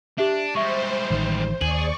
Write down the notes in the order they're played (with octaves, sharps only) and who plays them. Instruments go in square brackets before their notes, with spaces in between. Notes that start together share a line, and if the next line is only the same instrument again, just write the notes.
[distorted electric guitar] D4 [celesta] G4 E5
[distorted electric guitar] G3 G#3 [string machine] C5 [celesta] E5 C#6
[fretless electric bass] A1 D#3
[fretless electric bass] D#2 [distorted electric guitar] G#4 [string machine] D5 C#6 [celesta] F#7